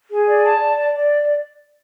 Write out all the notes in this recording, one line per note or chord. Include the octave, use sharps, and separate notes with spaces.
G#4
D5
A5
D5
D5
D5